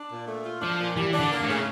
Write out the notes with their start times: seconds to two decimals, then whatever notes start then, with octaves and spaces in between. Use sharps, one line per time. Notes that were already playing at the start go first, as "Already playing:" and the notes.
Already playing: D4
0.10 A#2
0.27 A3
0.45 F4
0.62 F3 D4
0.79 A#2
0.97 E3 G3
1.13 D4
1.20 D3
1.31 A#3
1.42 A2
1.49 C#3